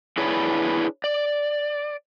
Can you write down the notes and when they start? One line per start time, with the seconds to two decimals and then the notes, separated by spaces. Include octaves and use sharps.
0.17 D4 E4 G#4 B4 C#5 D5
1.04 D5